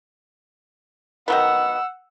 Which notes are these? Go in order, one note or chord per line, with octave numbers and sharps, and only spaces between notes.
D#3 F#3 B3 F#5 E6